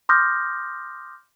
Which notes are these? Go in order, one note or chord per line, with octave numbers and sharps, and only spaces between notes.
C6 D6 D#6 F6 G6 A#6